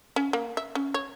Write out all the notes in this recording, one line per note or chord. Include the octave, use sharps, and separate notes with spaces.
C#4
A#3
E5
C#4
C#5